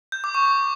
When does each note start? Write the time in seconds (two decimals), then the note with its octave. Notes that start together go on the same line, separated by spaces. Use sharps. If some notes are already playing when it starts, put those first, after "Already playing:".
0.12 G6
0.24 D6
0.35 C#6
0.46 D6